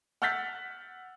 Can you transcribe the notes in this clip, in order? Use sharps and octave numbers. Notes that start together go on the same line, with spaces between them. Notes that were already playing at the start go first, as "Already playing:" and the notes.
F#5 E6 F6 G6 A6 B6